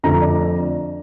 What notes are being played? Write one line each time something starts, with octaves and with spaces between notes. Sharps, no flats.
F2 D3 A3 A#5
D5